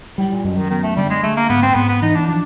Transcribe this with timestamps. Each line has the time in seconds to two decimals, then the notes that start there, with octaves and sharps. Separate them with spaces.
0.18 A2 G3
0.32 A#2
0.44 F#2 B2
0.57 D#3
0.70 D#3 B3
0.83 A3
0.96 D3 G3
1.10 G#3
1.23 G#3 A3
1.37 A#3
1.49 G#2 B3
1.63 C4
1.75 G#2 B3
1.89 B3
2.02 E3 D#4
2.15 D4
2.27 F3 D4